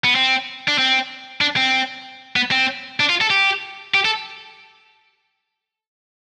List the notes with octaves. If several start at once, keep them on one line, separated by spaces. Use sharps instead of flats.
B3
C4
D4
C4
D4
C4
B3
C4
D4
F4
A4
G4
G4
A4